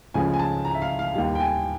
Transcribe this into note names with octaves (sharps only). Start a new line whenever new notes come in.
C#2 C#3 F3 A3 G#5
G#5
A5
A#5
E5
F5
F5
D#2 D#3 G3 F5
G5
G#5